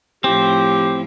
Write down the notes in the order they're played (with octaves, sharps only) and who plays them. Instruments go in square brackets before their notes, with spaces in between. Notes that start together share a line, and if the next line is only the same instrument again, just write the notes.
[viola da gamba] A2 F3 E4 [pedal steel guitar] C4 [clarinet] G4